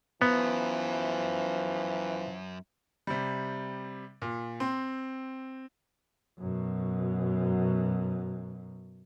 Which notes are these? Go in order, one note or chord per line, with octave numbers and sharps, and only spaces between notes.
F#2 E3 F3 B3
C3 G3
A#2
C4 C6
F#2 B2